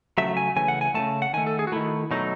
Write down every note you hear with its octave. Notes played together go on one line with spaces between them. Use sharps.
C#3 F#3 A3 E5
G#5
C#3 E3 A3 G#5
F#5
G#5
C#3 E3 A3 A5
F#5
D#3 A3 G#5
A4
G#4
F#4
D#3 A3 E4
B2 F#3 A3 D#4